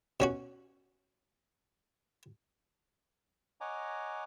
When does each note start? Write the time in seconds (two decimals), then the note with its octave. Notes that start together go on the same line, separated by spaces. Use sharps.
0.20 B2 C#4 F#4
3.61 C#5 D#5 F#5 G#5 A#5 D6